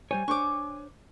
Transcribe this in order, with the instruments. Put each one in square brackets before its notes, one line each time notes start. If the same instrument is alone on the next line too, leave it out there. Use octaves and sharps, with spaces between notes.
[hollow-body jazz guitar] G3 C5 C#5 [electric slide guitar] G#5
[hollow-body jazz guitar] D4 C5 C#5 [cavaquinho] C#6 D6